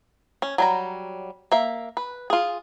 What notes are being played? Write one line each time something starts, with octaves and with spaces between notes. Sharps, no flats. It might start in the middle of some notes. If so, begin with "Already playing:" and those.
C#4
F#3 G3 A#5
A#3 E5
B4
F4 G#4